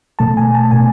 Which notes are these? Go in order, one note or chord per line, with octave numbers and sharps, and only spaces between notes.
B2 A3 A5
G#5
A5
B2 A3 G#5